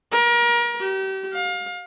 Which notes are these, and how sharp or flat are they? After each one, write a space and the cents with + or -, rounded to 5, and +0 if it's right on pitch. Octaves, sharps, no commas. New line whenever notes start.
A#4 +35
G4 -35
F5 +30